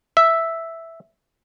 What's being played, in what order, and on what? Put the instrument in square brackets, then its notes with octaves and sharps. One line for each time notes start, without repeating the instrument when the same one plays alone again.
[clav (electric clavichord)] E5